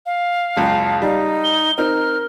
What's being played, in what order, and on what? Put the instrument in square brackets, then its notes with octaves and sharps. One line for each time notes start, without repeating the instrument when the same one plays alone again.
[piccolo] F5
[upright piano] F#1 C#2 [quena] A5
[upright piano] G3 [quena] D#4
[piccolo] G7
[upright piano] C4 D#4 [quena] A#4 [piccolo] F6